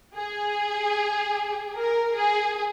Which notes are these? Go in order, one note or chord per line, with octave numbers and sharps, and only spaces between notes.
G#4
A#4
G#4